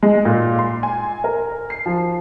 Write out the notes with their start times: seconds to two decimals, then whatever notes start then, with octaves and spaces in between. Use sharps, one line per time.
0.03 G#3
0.25 A#2
0.59 C6
0.83 G#5
1.24 A#4
1.70 C7
1.86 F3